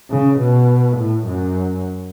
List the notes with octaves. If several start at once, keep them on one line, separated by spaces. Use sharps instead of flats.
C#3
B2
A2
F#2